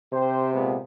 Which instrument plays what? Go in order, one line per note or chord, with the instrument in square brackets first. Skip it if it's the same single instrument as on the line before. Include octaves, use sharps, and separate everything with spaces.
[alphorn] C3 [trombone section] G4 C5
[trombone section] A#2 G#3 B3